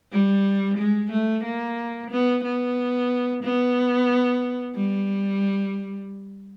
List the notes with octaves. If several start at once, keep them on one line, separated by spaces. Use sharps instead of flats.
G3
G#3
A3
A#3
B3
B3
B3
G3